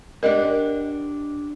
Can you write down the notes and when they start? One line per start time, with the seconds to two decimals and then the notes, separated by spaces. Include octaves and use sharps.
0.23 D4 G4 A#4 D#5 F#5